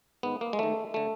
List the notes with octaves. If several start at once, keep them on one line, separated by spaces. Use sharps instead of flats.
G#2 D#3 B3
A#3
G#3
G#2 D#3 A3
D3 A3